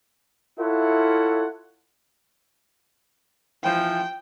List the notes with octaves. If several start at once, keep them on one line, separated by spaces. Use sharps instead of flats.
E4 F4 A4 C#5 E5 F#5
E3 F3 G5